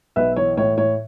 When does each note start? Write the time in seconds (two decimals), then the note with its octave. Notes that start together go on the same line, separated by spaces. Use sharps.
0.16 B1 B4 E5
0.36 E3 C#5
0.57 A2 C#5
0.77 A2 C#5